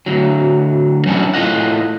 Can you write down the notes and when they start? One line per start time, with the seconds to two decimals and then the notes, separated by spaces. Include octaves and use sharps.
0.06 D2 F#3
1.06 F#3 C#4 D4 E4
1.34 A2 F4 D#5 F#5